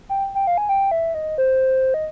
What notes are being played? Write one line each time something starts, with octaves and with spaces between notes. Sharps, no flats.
G5
G5
F5
G#5
G5
E5
D#5
C5
D#5